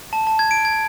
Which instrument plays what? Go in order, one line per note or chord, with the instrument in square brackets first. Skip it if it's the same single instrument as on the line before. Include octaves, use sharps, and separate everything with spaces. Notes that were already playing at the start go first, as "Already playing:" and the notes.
[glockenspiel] A5
A5
G#6
D7
G#6